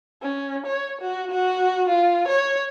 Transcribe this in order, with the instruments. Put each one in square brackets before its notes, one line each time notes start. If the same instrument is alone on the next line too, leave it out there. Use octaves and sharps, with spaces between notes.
[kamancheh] C#4
C#5
F#4
F#4
F4
C#5